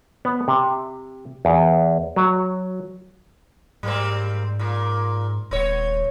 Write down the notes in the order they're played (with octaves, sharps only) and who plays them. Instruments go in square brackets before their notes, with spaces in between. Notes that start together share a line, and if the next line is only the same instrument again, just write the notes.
[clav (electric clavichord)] B3
C3
E2
F#3
[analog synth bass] G#2 [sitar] G3 A#3 C4
[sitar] A#2 A#3
[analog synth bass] D#1 [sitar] B3 C#5